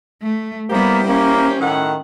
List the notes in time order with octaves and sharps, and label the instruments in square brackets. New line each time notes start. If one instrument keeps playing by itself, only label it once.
[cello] A3
[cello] G3 B3 [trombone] A#3 [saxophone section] E4 G4 C5
[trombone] A#3 [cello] C#4
[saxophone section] A2 F#5 [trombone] D#3